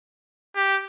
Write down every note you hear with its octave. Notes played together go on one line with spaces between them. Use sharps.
G4